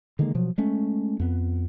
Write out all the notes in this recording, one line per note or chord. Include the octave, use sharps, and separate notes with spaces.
D3 D#3 G#3 A#3
B2 F3 F#3
G#3 A3 C#4
F2 B3